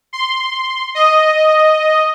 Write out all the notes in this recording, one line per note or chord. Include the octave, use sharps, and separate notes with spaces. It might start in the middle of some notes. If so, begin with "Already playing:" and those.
C6
D#5